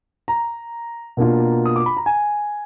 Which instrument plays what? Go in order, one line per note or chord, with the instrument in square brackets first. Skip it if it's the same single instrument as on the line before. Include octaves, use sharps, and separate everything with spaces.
[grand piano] A#5
B2 A#3 D4 F4
D#6
D6
B5
A#5
G#5